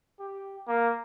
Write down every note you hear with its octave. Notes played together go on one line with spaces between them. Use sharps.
G4
A#3